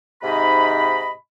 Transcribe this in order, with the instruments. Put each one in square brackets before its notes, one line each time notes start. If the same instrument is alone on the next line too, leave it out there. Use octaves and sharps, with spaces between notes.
[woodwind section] G#2 C3 D#4 D#5 B5